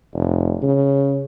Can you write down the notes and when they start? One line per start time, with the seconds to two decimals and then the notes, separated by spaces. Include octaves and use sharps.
0.13 F1
0.63 C#3